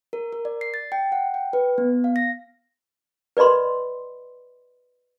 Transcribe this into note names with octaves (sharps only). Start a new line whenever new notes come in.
A#4
A#4
D5
C7
A6
G5
F#5
G5
B4
B3
F5
A#6
B4 D5 D#5 B5 C6